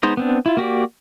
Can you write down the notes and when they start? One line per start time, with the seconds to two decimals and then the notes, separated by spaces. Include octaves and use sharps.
0.03 G#3 B3 D#4 C5 D#5
0.17 B3 C4 D4
0.46 E4 F4
0.57 A#3 F#4 G4 D5